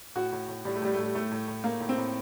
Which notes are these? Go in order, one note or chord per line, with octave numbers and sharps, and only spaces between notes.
A2 F#4
A2
A2
A2 G3
A3
A2 G3
A3
A2 G3
A2 A3
A2
A2
A2 A#3
A2
C4
A2